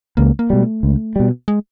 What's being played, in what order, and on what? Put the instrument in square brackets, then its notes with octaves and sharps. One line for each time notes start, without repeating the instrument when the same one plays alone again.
[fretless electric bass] C#2 [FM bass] A#3
[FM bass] A#3
[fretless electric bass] B2 G3 [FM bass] G#3
[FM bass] A3
[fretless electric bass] C#2
B2 G3
[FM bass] G#3